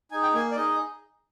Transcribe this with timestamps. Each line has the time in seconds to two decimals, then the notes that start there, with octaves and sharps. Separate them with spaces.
0.11 D#4 G#4 G#5
0.23 G5
0.33 A#3 G#5
0.51 D5
0.56 D#4 G#4 D#5